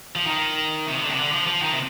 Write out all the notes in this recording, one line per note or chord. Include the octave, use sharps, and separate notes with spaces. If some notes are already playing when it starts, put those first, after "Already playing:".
F3
D#3
C3
D#3
D3
C3
D3
F3
F3
D#3
C3